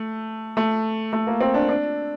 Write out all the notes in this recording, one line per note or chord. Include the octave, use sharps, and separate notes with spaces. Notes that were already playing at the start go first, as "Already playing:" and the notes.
Already playing: A3
A3
A3
A#3
C4
D4
D4